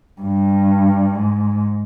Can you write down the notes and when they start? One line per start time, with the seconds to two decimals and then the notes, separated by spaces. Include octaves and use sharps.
0.22 G2
1.14 G#2